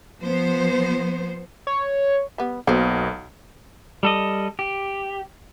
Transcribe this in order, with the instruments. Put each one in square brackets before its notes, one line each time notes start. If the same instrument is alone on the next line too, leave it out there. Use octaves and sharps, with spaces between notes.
[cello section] F3 B3 C5
[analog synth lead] C#5
[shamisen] G3 B3
[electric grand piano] B1 B2 [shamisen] A#3 A4 C5
[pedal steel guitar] G3 A4 D#5
G4